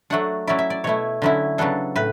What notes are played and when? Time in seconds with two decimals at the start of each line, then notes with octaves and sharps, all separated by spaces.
0.10 F#3 A3 D4 F#5
0.47 F#3 C#4 E4 D5
0.59 E5
0.70 D5
0.84 B2 A3 E4 C#5
1.22 D3 F#3 C#4 E4
1.58 C#3 F#3 B3 D4 A4
1.96 A2 B4